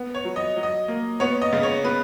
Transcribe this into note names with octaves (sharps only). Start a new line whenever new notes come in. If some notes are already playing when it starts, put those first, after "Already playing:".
Already playing: B3
C#5
F#3
D#5
F#3
D#5
A#3
B3 C#5
D#5
C#3
C#5
B3 B4